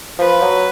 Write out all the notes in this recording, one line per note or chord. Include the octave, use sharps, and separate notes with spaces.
F3 B4
F#3